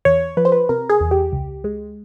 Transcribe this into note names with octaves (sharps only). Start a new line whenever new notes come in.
E2 C#5
F3 B4
C5
B4
C3 A#4
G#4
E2
G4
C#2
G#3